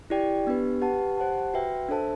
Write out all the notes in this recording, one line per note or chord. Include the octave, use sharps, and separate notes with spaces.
E4 G4 D5 G5
B3 D4 G4 B4
G4 B4 F#5 A5
G4 C5 F#5 A5
F#4 B4 E5 G5
D4 A4 C5 E5 A5